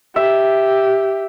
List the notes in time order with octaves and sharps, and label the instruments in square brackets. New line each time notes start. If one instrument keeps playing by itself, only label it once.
[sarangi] G4 [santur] E5